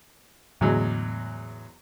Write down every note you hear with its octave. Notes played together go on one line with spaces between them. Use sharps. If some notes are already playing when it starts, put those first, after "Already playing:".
E2 A2 D3 F#3 G#3